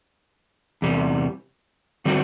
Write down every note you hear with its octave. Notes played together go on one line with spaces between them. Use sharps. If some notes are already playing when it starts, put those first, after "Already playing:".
E2 C3 G3
D3 G3 C4 F#4